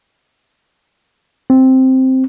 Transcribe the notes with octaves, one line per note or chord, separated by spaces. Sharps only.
C4